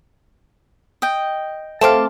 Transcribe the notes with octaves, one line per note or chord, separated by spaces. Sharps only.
D#5 G5
A3 C4 F5 A5 C6 D6